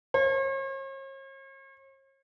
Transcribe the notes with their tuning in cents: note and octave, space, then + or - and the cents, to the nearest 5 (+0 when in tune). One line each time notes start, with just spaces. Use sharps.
C#5 -45